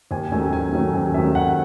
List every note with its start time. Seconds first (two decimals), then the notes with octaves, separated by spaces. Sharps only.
0.11 D#2 G#5
0.32 D#3 F#3 A3 C#4 G#5
0.53 D#2 G#5
0.72 D#3 F#3 A3 C#4
0.93 D#2 G#5
1.14 D#3 F#3 A3 C#4 E5
1.35 D#2 F#5